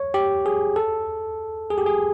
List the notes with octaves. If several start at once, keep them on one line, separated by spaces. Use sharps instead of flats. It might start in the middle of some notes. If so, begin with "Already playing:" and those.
Already playing: C#5
G4
G#4
A4
G#4
G4
G#4